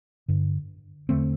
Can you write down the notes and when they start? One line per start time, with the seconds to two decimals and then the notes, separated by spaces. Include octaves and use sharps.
0.28 G2 D3
1.09 E2 D3 A3 C4